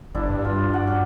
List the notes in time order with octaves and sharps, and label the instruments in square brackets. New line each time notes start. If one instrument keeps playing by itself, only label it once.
[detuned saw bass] G1 [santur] D4 E4
[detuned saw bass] G2
[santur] F4
F#4 D5 F#5
C#4